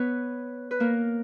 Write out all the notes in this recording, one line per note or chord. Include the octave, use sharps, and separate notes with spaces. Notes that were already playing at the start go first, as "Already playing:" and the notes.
Already playing: B3 B4 C#5
B4
A#3 A#4